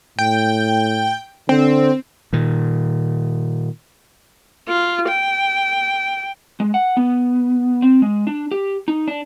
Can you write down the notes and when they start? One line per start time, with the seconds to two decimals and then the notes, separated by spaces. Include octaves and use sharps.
0.19 A2 G5
1.49 D3 C4
2.33 A#2 D#3
4.68 F4
5.08 G5
6.60 G#3
6.74 F#5
6.97 B3
7.82 C4
8.02 G#3
8.27 D4
8.51 G4
8.88 D#4
9.08 D4